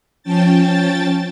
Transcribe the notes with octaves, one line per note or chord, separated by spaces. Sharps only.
F3 C#4 G5 A5 A6